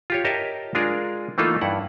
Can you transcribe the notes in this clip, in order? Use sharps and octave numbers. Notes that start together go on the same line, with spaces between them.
F4 G4 C#5
G4 A#4 C#5 D#5 E5 A5
G#3 D4 F4 G#4 A#4
E3 A3 A#3 D#4 F4 A4
G2 E4 F#5